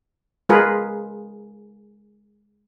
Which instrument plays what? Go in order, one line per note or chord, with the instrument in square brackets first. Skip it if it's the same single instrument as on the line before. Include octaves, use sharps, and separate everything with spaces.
[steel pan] G#3 F4 G#4 A#4 B4